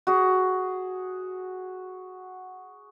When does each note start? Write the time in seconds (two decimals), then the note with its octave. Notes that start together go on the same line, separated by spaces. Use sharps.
0.07 F#4 G#4